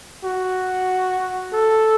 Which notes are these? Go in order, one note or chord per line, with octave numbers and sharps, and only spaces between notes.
F#4
A4